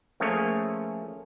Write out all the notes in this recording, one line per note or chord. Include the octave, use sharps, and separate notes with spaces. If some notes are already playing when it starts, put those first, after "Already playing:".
F3 A3 A#3 C#4 G#4 C#5